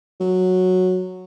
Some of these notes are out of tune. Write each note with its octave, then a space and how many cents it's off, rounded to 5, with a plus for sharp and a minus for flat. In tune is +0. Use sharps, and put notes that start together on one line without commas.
F#3 -5